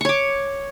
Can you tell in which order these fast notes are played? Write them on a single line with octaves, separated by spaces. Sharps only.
C#6 C#5 D6